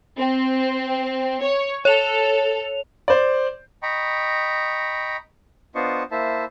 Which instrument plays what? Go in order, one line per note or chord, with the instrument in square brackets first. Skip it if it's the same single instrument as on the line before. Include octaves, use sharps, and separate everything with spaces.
[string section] C4
C#5
[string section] A4 [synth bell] C#5 F7
[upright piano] C5 D5
[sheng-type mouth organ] D#5 G5 A#5 B5 C#6
B3 D4 F4 C5 D#5 C#6
A#3 E4 C5 E5 A5